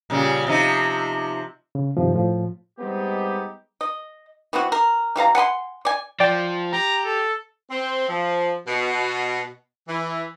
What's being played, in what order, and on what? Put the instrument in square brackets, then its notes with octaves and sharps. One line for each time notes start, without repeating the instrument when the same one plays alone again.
[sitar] A#2 C#3 G3
C3 F3 D#4
[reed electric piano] C#3
G2 C3 D#3 F3
A2 F3
[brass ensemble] G3 G#3 B3 C4 D#4 G4
[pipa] D#5
E3 B3 C4 F#4
A#4
E3 G3 F5 A#5
F#5 G#5 B5 C6
D5 G#5
[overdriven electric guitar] F3 [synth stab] D5 G5
[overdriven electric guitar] G4 [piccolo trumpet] A#5
[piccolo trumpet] A4
[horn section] C4
F3
B2
E3